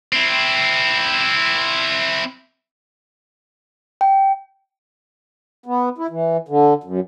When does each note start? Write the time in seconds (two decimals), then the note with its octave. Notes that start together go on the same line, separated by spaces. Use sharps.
0.13 C4 E4
4.01 G5
5.66 B3
5.98 E4
6.10 E3
6.48 D3
6.84 F#2